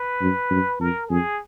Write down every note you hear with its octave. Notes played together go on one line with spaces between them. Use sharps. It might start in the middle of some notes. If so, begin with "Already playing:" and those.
Already playing: B4
F#2
F#2
F2 A#4
F2 G#4